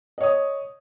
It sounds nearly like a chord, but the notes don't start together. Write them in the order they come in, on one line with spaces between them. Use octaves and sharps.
D#5 C#5 D#6